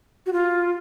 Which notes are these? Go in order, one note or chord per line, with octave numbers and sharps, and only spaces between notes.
F#4
F4